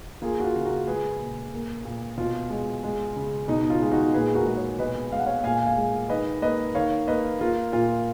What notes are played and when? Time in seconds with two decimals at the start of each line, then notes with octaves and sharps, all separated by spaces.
0.22 A#3 F4 G#4
0.40 F#4
0.43 F4 G#4
0.55 C#3
0.65 F#4 A#4
0.87 G#3 G#4 B4
1.20 A#2
1.53 A#3
1.85 A#2
2.17 B2 F4
2.50 G#3
2.84 G#3
3.16 C#3
3.48 B2 D#4
3.70 F4
3.82 G#3
3.92 D#4 F#4
4.14 A#2 G#4 B4
4.28 G#4
4.35 F#4 A#4
4.46 G#3
4.57 A#4 C#5
4.79 B2 B4 D#5
5.12 G#3 F5
5.19 F#5
5.26 C#5 F5
5.44 A#2 F5 G#5
5.66 F5 G#5
5.77 G#3
6.09 D#3 B4 D#5
6.42 A#3 B4 D#5
6.75 D#3 C#5 F5
7.07 A#3 B4 D#5
7.40 A#3 F4
7.72 A#2 F4